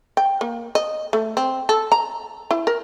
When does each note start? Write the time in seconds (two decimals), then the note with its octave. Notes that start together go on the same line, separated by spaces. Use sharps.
0.17 G5
0.41 A#3
0.75 D#5
1.13 A3
1.37 C4
1.69 A4
1.92 A#5
2.51 E4
2.67 A#4